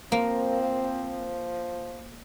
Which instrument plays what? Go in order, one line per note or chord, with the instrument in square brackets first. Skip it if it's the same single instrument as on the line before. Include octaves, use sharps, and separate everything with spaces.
[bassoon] F3 [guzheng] A#3 [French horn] C4